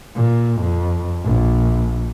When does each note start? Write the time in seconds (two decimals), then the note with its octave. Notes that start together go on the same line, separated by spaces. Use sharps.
0.16 A#2
0.61 F2
1.25 A#1